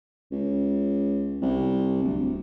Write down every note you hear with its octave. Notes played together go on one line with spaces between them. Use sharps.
C#2
C2
D1